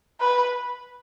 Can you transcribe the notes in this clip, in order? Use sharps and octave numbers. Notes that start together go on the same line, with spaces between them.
B4